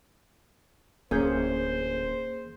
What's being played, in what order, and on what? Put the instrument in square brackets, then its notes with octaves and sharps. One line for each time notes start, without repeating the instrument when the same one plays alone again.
[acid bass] D1 [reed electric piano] A#3 G#4 G6 [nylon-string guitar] C#4 [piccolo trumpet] C5